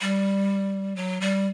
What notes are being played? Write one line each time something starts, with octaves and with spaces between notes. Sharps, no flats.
G3
F#3
G3